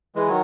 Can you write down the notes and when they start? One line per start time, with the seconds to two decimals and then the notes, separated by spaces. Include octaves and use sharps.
0.15 E3 G#3
0.28 D#3 F#3